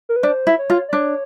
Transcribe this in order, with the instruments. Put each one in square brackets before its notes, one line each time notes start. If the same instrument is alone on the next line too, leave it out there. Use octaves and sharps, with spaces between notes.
[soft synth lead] A#4
B4
[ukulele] D4 [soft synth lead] C5
[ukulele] E4
[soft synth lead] C#5
[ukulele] F4
[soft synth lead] D5
[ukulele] D4 [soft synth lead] C#5